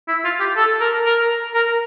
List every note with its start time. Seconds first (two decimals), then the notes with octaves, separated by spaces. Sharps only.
0.08 E4
0.24 F4
0.40 G4
0.57 A4
0.81 A#4
1.06 A#4
1.54 A#4